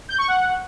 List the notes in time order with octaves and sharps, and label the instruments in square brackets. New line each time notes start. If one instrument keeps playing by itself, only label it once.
[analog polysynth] G6
C#6
F#5